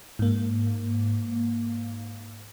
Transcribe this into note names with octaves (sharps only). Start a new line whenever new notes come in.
G#2 A#3